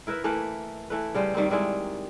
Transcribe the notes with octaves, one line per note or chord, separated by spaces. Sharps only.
E4 A#4 B4 E5
E3 A3 A#3 B4
E3 A3 B4
C#3 G3 C5
D#3 G3 A#3 C4
D#3 G3 G#3 E4